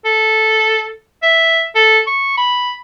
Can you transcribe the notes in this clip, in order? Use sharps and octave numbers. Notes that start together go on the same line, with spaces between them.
A4
E5
A4
C#6
B5